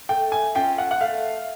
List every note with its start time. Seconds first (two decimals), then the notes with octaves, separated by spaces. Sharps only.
0.09 A3 G5
0.32 G#5
0.55 C#4 F4 A4 G5
0.78 F#5
0.91 F#5
1.00 A3 F5